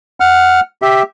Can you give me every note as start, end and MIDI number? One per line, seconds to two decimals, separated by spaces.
0.20 0.60 78
0.20 0.60 89
0.82 1.03 67
0.82 1.03 76